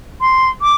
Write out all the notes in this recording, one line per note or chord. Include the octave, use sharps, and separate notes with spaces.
C6
D6